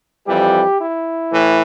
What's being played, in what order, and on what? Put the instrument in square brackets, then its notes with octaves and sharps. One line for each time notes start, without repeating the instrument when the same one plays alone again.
[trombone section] F2 E3 G3 G4
E4
A2 E3